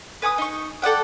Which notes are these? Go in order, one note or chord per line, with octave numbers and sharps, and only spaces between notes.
B4 G#5 C#6 D#6
D#4 C#6
A4 D5 F#5 G5